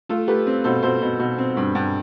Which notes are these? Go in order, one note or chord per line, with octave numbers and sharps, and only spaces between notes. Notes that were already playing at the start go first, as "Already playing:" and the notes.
A3 F4 A4
A3 G4 B4
C4
B2 A4 C5
B2 A4 C5
B2
B2
C4
G2
G2